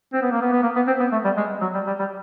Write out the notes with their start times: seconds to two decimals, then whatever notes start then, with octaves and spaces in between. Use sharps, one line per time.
0.13 C4
0.22 B3
0.32 A#3
0.41 B3
0.52 B3
0.63 A#3
0.76 B3
0.87 C4
1.00 B3
1.12 A3
1.24 G3
1.37 G#3
1.61 F#3
1.74 G3
1.87 G3
1.99 G3